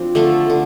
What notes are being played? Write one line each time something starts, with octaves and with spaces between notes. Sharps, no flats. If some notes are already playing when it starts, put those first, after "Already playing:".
Already playing: F3 C4 D4
D3 A3 F4 A4
D3